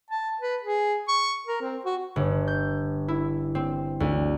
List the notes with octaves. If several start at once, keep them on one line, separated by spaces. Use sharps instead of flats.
A5
B4
G#4
C#6
A#4
C4
F#4
G1
G6
E4
C4
D2